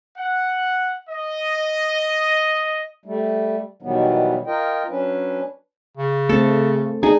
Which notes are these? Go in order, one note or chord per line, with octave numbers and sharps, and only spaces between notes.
F#5
D#5
G3 A3
B2 D#3 E3 F#3 G3 B3
F4 A#4 D#5 G5
F#3 C#4 D4 B4
C#3
A3 C4 A4
D4 D#4 G#4